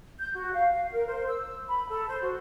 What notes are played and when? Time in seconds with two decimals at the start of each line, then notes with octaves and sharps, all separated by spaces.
0.19 G6
0.33 F#4
0.54 F5
0.73 F5
0.93 A#4
1.07 C5
1.30 E6
1.68 B5
1.89 A4
2.08 C5
2.22 F#4